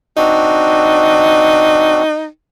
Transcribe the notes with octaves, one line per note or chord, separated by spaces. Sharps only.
C4 D4 D#4 F#4